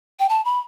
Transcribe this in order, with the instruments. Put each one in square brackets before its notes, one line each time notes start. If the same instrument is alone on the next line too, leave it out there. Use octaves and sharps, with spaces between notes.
[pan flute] G5
A5
B5